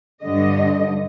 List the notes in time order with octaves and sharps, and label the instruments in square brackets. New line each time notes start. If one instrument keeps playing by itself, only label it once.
[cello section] G2 D3 D#5